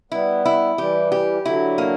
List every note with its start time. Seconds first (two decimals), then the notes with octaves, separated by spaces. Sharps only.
0.12 G3 B3 E4
0.45 E4
0.78 E3 G3 G4
1.12 G4
1.45 D3 F#3 E4
1.78 A#3